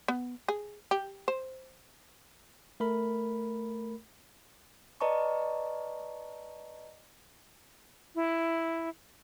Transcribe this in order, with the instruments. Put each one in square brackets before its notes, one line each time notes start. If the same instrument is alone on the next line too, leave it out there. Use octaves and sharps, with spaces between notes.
[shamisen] B3
G#4
G4
C5
[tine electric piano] A3 A#4 B5
[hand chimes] B4 D5 D#5 A5 A#5 C#6
[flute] E4